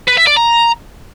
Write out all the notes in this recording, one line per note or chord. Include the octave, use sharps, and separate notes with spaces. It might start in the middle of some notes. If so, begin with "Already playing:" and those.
B4
E5
D5
A#5